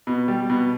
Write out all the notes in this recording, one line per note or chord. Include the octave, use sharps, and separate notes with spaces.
B2
G3
B2